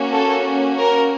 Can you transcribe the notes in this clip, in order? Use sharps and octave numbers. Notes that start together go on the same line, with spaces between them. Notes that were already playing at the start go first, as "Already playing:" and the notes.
Already playing: A#3 C#4 F#4
A4
A#4